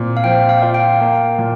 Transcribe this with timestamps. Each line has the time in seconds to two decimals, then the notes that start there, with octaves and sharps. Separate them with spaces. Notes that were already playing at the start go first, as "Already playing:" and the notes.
Already playing: A#2 C4
0.17 F5
0.24 F3 G5
0.49 F5
0.62 F4
0.74 G5
1.01 A#3
1.39 A#2